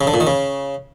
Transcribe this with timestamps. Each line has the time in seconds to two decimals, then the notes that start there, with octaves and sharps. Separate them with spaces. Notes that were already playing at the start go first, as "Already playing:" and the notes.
0.01 C#3
0.07 D3
0.14 A#2
0.20 D#3
0.27 C#3